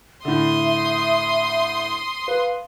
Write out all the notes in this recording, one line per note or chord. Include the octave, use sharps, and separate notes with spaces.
A2 D3 E5 C6 D#6
B4 F5